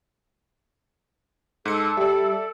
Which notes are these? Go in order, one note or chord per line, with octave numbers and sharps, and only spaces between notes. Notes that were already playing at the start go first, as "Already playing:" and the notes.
G#2 A4 C#7
G3 D5 E5